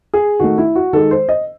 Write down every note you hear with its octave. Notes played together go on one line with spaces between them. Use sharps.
G#4
D#3 A3 F#4
E4
F#4
D#3 G#3 A4
C5
D#5